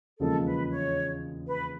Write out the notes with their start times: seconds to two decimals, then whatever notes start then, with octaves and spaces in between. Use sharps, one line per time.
0.19 E1 D#2 C#3 F3 G#3 A4
0.45 B4
0.71 C#5
1.47 B4